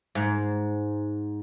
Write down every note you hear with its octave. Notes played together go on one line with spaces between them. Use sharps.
G#2